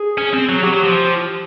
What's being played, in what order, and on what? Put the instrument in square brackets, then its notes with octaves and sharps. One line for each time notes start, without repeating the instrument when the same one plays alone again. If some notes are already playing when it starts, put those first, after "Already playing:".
Already playing: [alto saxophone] G#4
[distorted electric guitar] C#4
C4
F#3
[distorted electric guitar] F#3 [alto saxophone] G4
[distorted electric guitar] F#3
F3